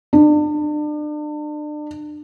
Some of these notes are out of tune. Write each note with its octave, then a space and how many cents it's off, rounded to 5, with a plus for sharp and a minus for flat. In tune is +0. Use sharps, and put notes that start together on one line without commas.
D4 +35